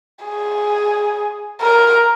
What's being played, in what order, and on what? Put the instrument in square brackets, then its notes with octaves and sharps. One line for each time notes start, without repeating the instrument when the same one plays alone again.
[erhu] G#4
A#4